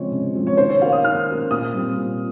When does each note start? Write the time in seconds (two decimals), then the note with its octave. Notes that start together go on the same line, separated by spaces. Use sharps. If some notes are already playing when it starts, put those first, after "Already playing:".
Already playing: C#3 F3 G#3 C4 C#5
0.12 C#3
0.35 F3 G#3 C4
0.47 C#5
0.57 D#3 C5
0.69 C#5
0.82 A#3 C#4 F5
0.92 D#6
1.04 D#3 F6
1.28 A#3 C#4
1.51 A#2 D#6
1.74 G3 C4
1.97 A#2